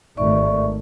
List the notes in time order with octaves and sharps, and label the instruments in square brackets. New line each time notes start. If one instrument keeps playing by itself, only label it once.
[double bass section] G#1 D#3 A3 [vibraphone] D5 E5 C#6